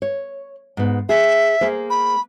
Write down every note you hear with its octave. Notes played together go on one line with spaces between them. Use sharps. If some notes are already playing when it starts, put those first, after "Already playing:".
C#5
G#2 B3
G#4 E5
A#3 G#4 C5
B5